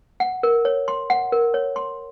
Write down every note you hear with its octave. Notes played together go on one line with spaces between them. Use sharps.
F#5
A#4
C#5
C6
F#5
A#4
C#5
C6